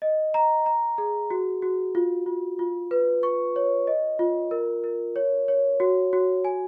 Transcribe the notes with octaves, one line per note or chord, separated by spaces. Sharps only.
D#5
A#5
A#5
G#4
F#4
F#4
F4
F4
F4
B4
C#6
C#5
D#5
F4
A#4
A#4
C#5
C#5
F#4
F#4
G#5